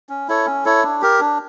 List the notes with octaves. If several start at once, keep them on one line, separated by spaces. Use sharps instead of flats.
C#4
E4 A4 C#5
C#4
E4 A4 C#5
D4
G4 A#4
D4